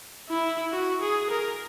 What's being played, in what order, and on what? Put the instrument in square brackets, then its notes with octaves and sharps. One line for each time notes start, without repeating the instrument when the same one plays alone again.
[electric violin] E4
F#4
G#4
A#4